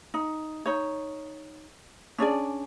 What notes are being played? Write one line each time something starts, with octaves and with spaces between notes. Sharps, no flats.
D#4
D#4 C#5
C#4 D4 G#4 D5